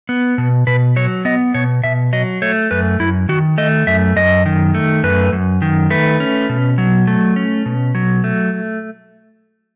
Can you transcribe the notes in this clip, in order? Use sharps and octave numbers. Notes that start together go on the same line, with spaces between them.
B3
B2
B2 B4
F#3 C#5
B3 D#5
B2 C#5
B2 E5
F#3 D#5
A3 C#5
F#2 B4
F#2 E4
D#3 F#4
A3 D#5
F#2 E5
F#2 D#5
D#3
A3
F#2 B4
F#2
D#3
A3 B4
C#4
B2
F#3
A3
C#4
B2
F#3
A3